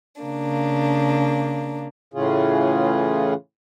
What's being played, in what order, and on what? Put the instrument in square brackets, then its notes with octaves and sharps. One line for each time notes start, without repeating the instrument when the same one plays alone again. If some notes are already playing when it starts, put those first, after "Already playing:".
[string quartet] C#3 A#3 D4
[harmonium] A2 C#3 E3 C#4 F4 G#4